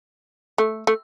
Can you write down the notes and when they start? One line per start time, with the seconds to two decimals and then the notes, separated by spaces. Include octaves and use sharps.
0.58 A3
0.87 A3